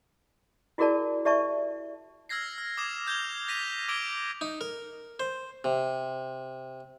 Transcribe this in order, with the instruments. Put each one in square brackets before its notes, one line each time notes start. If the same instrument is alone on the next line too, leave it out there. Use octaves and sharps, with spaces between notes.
[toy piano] E4 F#4 G#4 A#4 D5 A5
G4 D5 E5 A5 C#6
[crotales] E6 F6 G#6 A#6 C7
F6
D6 D#6 G#6 E7
F6 G6 G#6 F7 G7
F6 A#6 B6 D#7 F7
D6 E6 G#6 D7 G7
[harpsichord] D#4
A#4
C5
C3